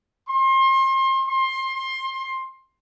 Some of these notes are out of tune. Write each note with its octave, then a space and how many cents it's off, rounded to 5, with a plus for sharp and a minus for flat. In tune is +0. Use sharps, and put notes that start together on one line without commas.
C6 +35
C6 +20